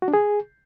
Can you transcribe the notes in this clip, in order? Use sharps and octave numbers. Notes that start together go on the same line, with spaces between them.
F#4
D4
G#4